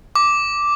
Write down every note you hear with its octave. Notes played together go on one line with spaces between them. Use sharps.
D6